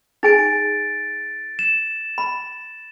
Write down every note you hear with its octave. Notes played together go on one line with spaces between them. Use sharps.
D#4 G#4 G#5 A6 D7
E7
B5